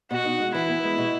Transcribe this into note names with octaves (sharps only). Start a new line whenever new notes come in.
B2 F#4
D#4
G#3
E3 E4
B3
G#3
B2